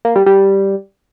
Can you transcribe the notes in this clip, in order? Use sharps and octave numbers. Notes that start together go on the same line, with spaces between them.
A#3
G3
G3